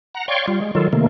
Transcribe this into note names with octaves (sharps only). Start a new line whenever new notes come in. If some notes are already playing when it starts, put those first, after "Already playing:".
F#5 A#5
C#5 D5 F5 G5 C6 C#6
G3 F4
G#3
D#3 F#3 F4 A4
C3 D#3 A3 A#3